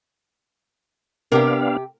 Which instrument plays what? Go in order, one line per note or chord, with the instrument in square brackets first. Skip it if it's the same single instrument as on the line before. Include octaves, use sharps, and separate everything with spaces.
[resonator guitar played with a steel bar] C3 G4 G5 [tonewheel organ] B3 D4 F5 [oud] A#4